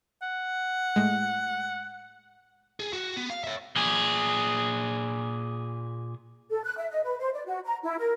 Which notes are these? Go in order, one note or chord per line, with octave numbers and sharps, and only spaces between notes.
F#5
A2 G#3
G#4
F#4
B3
F5
C#5 E5
A#2 G#4
A4
F#6
E5
D#5
B4
C5
D5
F#4
A#5
E4
A#4